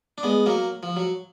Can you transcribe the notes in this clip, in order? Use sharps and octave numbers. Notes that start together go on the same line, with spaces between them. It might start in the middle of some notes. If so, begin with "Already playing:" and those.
D4
G#3 B3
F#3 A#3
F3
F#3